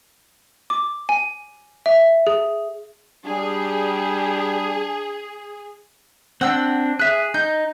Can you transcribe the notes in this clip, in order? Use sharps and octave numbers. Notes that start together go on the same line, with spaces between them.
D6
G#5
E5
G#4
G3 D4 G#4
C4 D4 F#5 E6
G#4 E5 F#6
D#4 G6